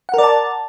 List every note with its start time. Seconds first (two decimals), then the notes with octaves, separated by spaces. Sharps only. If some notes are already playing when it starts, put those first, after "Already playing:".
0.09 F#5
0.14 A#4
0.18 D5
0.23 A5